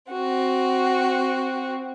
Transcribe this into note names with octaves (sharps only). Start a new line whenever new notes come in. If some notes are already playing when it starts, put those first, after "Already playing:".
C4 F#4